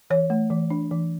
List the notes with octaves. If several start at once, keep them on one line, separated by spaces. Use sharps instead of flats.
E3 C#5
A3
E3
D4
E3